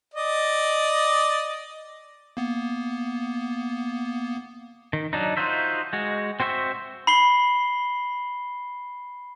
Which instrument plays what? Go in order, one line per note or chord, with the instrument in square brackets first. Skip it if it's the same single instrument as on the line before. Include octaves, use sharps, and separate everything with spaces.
[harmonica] D5 D#5
[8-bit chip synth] A#3 B3
[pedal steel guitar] D#3
F#3 D4 D#4
D#4 F4 F#4 C5 E5
G#3 F#4
C4 F#4 C5 E5 C#6
[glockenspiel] B5 C7 G7